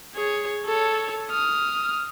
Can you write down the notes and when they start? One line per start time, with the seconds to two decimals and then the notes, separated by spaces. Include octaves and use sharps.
0.14 G#4 C#5
0.65 A4 C#5
1.30 D#6 F6